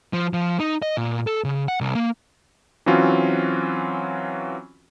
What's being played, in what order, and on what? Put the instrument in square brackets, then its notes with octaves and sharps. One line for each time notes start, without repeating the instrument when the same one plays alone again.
[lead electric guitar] F3
F3
D#4
D#5
A#2
A4
C#3
F#5
C2
A#3
[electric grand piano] E3 F#3 C4 C#4 F4 F#4